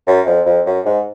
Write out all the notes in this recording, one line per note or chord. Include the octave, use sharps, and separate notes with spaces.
F#2
F2
F2
F#2
G#2